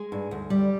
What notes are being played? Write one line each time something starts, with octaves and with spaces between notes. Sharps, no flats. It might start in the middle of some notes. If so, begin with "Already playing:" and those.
Already playing: G#3 G#4
G2
D2
G3